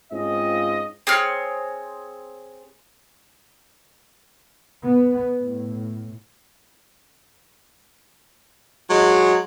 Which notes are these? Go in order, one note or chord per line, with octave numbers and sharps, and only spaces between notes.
G#2 C4 C#4 F4 D#5
C4 G#4 C#5 F6
B3
A2
F#3 G#3